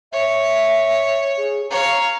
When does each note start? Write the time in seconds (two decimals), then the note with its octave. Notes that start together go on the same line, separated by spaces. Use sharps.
0.13 C#5 E5
1.38 G#4
1.70 C#5 F5 A#5